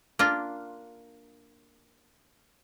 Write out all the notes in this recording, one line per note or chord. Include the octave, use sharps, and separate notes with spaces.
A#3 D4 F4